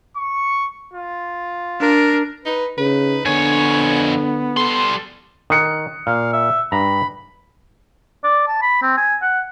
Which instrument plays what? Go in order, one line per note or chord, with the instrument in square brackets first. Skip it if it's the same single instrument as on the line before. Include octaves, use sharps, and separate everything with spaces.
[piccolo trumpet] C#6
F4
[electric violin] D4 A#4
[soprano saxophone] D#4 [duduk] B4
[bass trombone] C#3 [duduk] D#4 [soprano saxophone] B4
[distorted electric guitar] F2 C#5 [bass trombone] D3 [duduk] B3 [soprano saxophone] G#5
[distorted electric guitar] G3 C6 [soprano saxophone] A4
[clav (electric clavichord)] D#3 [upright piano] D#6 F#6 C#7
[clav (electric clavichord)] A#2 [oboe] F5
[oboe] E5
[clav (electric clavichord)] G2 A#5 [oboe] B5
[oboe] D5
A5
B5
C4
G#5
F#5